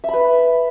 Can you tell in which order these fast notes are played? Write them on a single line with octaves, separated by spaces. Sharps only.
E5 B5 B4